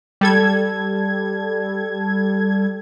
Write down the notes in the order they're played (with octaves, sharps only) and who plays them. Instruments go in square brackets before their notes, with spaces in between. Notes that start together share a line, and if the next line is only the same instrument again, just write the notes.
[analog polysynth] G3 A4 G#6